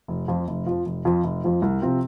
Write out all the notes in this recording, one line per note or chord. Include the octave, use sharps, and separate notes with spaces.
F1
F2 F3
F1
F2 F3
F1
F2 F3
F1
F2 F3
C2
C3 F3 C4